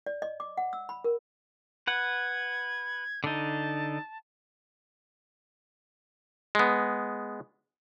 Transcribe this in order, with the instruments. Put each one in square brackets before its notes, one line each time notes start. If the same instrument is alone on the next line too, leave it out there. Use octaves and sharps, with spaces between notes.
[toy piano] D5
D#5
D6
F#5
E6
B5
A#4
[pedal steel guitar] B4 F#5 [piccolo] G#6
[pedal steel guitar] D3 D#4 [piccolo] A5
[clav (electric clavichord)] G#3 B3